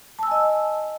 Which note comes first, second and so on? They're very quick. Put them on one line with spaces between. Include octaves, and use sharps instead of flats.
A5 E6 G#5 D#5